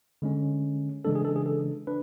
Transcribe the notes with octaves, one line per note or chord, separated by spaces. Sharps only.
D3 G#3 C#4
C#3 E3 G#3 D4 A4
G#4
A4
G#4
A4
D4 B4